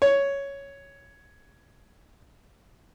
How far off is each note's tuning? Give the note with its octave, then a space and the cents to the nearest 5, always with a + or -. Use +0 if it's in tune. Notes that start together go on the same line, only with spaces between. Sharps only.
C#5 +5